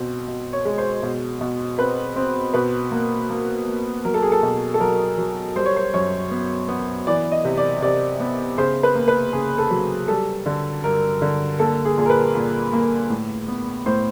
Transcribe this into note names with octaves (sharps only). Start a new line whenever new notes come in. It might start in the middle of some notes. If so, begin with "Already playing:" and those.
Already playing: B2 C4
B2
C#5
G#3
C5
B2
B2
C4 B4
C4
B2 B4
A#3
A#3
A#3
F#3 A#4
A4
G#4
A4
B2
A4
F#3 A#4
F#3
G3 C5
C#5
C5
F#2 C#5
B3
B3
E3 D5
D#5
C3
D5
C3 D5
B3
C#3 C5
B4
A#3
B4
C#3 G#4
A4
F#3
G3 A4
D3
G2 A#4
D3
A#3 A4
G#4
A#2 G#4
A#4
B4
A#2
A#3
A2
B3
A2 C5